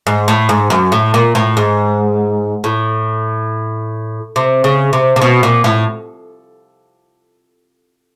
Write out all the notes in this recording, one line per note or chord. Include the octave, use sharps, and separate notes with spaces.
G#2
A2
G#2
F#2
A2
A#2
A2
G#2
A2
C3
C#3
C3
C3
B2
A#2
A2